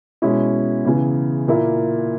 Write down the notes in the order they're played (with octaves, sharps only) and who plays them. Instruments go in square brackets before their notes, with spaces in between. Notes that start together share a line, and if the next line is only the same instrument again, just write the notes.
[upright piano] B2 G#3 C#4 E4
E2 C#3 E3
A#2 A#3 E4